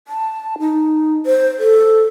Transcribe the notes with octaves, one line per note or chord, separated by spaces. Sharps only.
A5
D#4
C5
A4